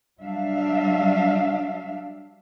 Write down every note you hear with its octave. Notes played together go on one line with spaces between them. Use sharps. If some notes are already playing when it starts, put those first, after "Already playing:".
F#3 G3 D4 E5 F5